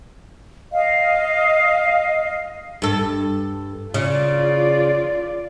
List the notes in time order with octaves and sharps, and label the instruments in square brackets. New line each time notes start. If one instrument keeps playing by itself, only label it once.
[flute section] D#5 F5
[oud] G2 A4
[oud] C#3 [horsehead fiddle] F4 D5